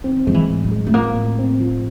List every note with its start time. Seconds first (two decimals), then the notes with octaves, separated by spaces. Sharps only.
0.04 D#3 C4
0.27 F3 G#3
0.34 E3
0.49 A2
0.64 F#3
0.71 G#3
0.87 A3
0.94 F3 A#3
1.16 A2
1.39 C4
1.60 F3